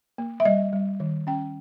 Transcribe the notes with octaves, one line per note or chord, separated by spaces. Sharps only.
A#3
E5
G3 D#5
G3
D#3
C#4 G5